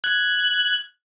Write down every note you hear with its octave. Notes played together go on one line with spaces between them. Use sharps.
F#6 G#6